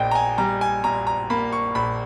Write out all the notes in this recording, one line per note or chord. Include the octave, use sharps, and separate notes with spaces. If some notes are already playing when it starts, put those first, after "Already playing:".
Already playing: A#1 A#3 D#5 G5
A#5
G#5
G3 A#5
G#5
A#2 A#5
A#5
A#3 B5
C#6
A#1 B5